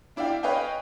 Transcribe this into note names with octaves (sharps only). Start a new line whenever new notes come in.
D4 E4 D5 E5 F5 G5
B4 C#5 D#5 F5 G5 G#5